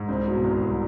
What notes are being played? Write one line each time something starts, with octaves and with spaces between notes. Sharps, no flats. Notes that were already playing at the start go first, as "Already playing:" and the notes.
Already playing: G#2
C2 C4
B2
C2
C2